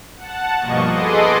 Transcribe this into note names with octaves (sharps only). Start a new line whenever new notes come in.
F#5 A5
G2 B2 F3 A#3 D#5 C#6
G#4 A4 B4 D#5 C6 D6